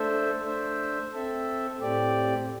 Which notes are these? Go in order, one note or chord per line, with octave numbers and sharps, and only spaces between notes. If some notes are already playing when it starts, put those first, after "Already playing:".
Already playing: A3 D4 A4 C5 E5
A3 D4 C5 E5
C4 A4 E5
A2 A3 C4 G4 D5